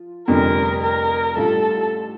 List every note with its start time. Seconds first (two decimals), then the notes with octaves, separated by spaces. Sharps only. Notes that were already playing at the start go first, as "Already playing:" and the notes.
Already playing: F3 F4
0.28 F1 F2 D3 G3 D4 A#4
0.83 A#4
1.36 A1 A2 G3 D4 F4 A4